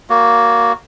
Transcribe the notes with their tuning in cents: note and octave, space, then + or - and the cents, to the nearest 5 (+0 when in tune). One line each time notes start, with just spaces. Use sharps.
A#3 +0 F#4 +0 C#5 +30